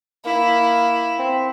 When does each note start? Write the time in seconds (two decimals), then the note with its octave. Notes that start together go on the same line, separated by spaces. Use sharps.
0.25 A#3 E4
1.18 C4